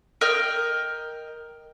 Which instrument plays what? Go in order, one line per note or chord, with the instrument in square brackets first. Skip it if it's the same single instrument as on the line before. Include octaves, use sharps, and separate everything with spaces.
[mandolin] A#4 D#5 G5 F6